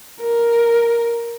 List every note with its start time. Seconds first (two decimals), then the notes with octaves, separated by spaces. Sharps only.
0.21 A#4